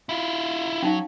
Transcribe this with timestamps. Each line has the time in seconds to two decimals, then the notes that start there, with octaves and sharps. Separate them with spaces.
0.09 E4 F4
0.82 F#3 C#4 D#4 F5